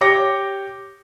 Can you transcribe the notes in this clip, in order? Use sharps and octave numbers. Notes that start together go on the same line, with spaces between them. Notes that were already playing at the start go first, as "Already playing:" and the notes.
G4 C#5 G5 D6 A#6 C#7